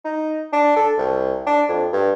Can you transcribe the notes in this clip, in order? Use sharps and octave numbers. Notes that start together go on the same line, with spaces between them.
D#4
D4
A4
C2
D4
F2
G2